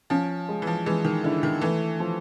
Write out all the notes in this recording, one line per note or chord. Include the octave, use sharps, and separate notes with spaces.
F3 C#4
G#3
E3
F3
E3 G#3
D#3
D3 E4
D#3
E3 A3
F3